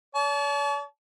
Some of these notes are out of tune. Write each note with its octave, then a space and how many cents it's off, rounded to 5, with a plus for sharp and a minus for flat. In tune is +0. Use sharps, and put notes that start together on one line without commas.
C#5 +45 A5 -35